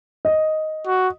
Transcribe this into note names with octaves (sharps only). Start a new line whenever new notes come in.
D#5
F#4